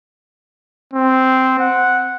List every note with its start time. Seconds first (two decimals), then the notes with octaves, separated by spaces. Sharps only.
0.94 C4
1.60 F#5